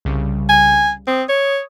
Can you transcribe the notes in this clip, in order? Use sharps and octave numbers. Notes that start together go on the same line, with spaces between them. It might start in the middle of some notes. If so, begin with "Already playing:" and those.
C2 C#3 G3
G#5
C4 D#6
C#5